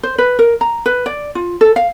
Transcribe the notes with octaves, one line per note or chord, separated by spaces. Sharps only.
C5
B4
A#4
A#5
B4
D5
F4
A4
F5